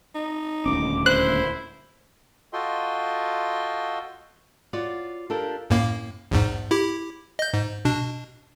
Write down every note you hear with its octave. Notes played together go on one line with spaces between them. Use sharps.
D#4
D#1 D2 C#4 D6
E4 C5 F#6
F4 F#4 A4 D#5 G5 C6
F4 F#4 C#5 D5
D4 F4 G4 A4 A#4 G5
F#2 A2 A#3
A#1 E2 G#2
E4 G4
D#5 G6
G#2
B2 D4